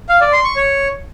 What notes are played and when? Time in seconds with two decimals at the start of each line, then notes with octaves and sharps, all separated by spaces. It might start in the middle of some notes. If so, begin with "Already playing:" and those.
0.09 F5
0.21 D5
0.33 C6
0.44 C#6
0.56 C#5